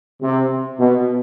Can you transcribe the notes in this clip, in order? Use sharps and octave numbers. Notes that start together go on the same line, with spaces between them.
C3
B2